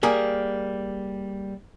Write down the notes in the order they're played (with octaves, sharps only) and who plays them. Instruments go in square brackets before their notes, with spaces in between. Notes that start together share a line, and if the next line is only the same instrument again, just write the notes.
[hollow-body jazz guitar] G3 A#3 G#4 A#4